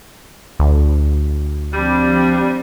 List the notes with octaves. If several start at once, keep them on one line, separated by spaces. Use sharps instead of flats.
D2
F3 G3 C4 D4